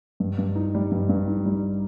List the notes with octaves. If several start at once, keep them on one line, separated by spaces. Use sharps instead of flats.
G2
G2
D#4
G3
G2
G2
D#4
G3